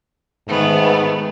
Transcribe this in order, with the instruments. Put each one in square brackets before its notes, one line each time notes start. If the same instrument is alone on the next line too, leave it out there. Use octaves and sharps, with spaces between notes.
[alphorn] G#2 [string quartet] D#3 A3 B3